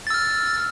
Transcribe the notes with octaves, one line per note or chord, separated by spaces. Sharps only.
E6 F6 A6